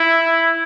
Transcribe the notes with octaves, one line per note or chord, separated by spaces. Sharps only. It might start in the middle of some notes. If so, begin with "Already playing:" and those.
Already playing: E4